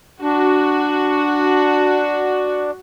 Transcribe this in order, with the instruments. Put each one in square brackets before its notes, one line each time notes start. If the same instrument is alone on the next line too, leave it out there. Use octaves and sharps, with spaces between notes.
[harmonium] D4 [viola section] F#4